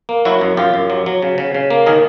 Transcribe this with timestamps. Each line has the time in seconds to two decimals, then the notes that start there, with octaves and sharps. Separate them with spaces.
0.09 A#3
0.25 F#3 E4 F#4
0.41 F#2
0.57 F#2 F4 G4
0.74 F#2
0.90 F#3
1.06 F#3
1.22 C#3
1.38 C#3
1.55 C#3
1.70 A#3
1.86 D#3 G#4 A#4